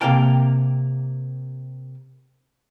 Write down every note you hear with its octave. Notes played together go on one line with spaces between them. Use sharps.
C3 F#3 A#3 F5 G5 A5